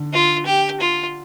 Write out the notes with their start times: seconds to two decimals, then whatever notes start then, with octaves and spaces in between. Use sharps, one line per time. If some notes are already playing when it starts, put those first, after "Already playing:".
Already playing: D3
0.13 F4
0.46 G4
0.81 F4